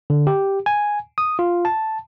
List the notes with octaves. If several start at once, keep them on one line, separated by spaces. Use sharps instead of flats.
D3
G4
G#5
D#6
F4
A5